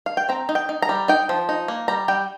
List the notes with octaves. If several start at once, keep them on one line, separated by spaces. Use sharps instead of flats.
F5
G5
C4 A#5
D#4
G5
D#4
A#5
G3
D#4 G5
F3
D#4
A#3
G3 A#5
G3 G5